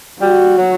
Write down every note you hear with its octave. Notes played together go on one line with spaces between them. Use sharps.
G3 F#4
F#3